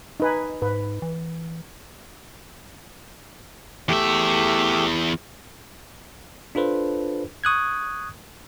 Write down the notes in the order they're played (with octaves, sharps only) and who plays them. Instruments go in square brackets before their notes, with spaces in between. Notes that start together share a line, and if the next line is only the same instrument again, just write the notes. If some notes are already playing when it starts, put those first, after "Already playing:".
[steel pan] D#4 B4 G#5
[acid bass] G#2 [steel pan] B4
[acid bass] E3
[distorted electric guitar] E2 E5 [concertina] A3 G4
[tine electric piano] D4 F4 A4 B4 C5
C#6 D#6 F#6 G#6